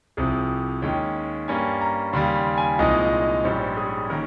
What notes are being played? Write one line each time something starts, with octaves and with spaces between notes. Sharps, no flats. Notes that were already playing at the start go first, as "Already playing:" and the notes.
C2 C3 F3 G#4
D#2 D#3 G#3 C#4 G5
G2 G3 A#3 C#4 G#5
A#5
D#2 C#3 G3 C6
C6
G#5
C2 A#2 F3 G#3 D#4 D#5
D#5
D#5
A#1 G#2 G3 C#4 C5
G#4
D#3 A#3 C#4 A#4